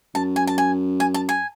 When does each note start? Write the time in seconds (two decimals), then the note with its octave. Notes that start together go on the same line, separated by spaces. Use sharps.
0.15 F#2 A5
0.36 G#5
0.47 A5
0.58 G#5
1.00 G#5
1.14 A5
1.29 G#5